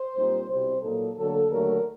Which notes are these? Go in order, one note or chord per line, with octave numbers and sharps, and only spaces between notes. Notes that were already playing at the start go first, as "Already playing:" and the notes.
Already playing: C5
A#2 G3 C4 D#4
C2 B2 G3 C4 C5
A#2 F#3 A#3 D#4 A4
D2 D3 F#3 A#3 A4
D#2 D3 F#3 A3 A#4